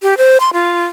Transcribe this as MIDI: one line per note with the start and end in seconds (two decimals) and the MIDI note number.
0.02 0.14 67
0.18 0.38 72
0.40 0.50 84
0.53 0.84 65